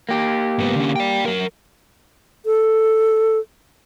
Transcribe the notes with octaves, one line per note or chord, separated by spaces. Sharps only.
A#3 G4
G#2 B3
D3 C#4
D5 G5
F#3 A#4
A4